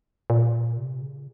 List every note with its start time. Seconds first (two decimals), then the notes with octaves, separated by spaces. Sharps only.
0.30 A#2
0.77 C3
1.02 C#3